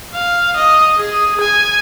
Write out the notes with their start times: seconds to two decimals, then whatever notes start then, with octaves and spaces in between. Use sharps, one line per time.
0.14 F5
0.56 D#5
0.96 G#4
1.41 G#5